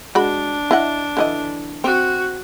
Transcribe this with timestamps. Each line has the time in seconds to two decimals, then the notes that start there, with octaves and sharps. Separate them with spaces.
0.15 G#3 D4 F#4 B5
0.71 E4 D#5 F#5
1.17 D3 E3 D#5
1.84 C4 F#4